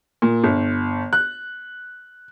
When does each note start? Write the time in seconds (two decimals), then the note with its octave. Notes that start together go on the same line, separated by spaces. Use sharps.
0.22 A#2
0.44 G1
1.13 F#6